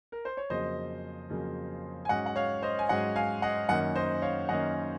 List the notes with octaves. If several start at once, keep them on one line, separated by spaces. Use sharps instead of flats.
A#4
C5
C#5
F2 C#3 F#3 A#3 C5 D#5
F2 C#3 F#3 A#3
G#5
G#2 F#3 C#4 D#5 F#5
F#5
C#5 F5
C5 D#5
G#5
G#2 F#3 C#4 D#5 F#5
F5 G#5
D#5 F#5
F#2 D#3 A#3 C#4 D#5 F#5
C5 D#5
C#5 F5
F#2 D#3 A#3 C#4 D#5 F#5